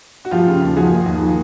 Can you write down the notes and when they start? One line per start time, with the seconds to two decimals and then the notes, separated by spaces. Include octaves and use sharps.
0.25 F#4
0.31 F3 F4 G4
0.47 C#3
0.62 D#2
0.76 F3 F#4 G#4
0.92 D#2
1.06 D#2
1.21 F3